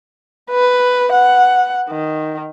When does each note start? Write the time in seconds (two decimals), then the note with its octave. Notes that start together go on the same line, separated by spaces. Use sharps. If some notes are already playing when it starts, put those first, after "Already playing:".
0.51 B4
1.12 F#5
1.90 D#3